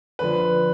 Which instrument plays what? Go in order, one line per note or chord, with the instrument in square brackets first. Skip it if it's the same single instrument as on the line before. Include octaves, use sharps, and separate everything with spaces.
[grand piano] D3 F3 B4